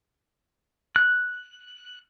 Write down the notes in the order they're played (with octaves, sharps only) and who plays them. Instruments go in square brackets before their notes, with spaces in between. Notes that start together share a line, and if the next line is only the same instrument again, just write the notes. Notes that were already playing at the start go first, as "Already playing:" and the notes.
[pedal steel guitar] F#6